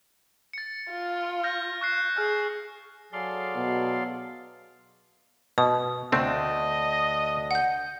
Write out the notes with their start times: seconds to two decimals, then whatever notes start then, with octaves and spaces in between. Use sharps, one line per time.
0.53 A6 C#7
0.91 F4
1.44 F6 G6 A#6
1.81 C#6 F#6 C7
2.17 G#4 F6
3.12 F#3 G#4 A4 D5 F5 C6
3.55 B2
5.58 B2 D#6
6.12 D2 A3 C4 D4 D#5
7.51 F#5 G6